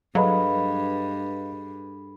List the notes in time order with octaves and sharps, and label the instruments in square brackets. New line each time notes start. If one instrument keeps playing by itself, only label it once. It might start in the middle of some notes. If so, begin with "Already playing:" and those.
[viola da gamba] G2 [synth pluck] F#3 [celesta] G#4 A4 B5 [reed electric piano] B4 D#5 F5